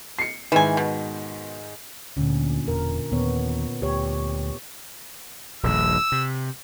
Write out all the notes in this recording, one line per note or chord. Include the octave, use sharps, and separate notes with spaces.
C7 C#7
G#2 D#3 E3 G#5
B2
D2 A#2 D3 C#4
E1 A#4
D#2 A#2 B3 C#5
D2 G4 C#5
D#1 A#1 G2 E6
C3